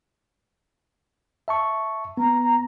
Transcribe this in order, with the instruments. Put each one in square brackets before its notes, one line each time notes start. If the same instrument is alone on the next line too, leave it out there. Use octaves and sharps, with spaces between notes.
[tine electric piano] E5 A5 C#6
[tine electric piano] B3 [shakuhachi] A#5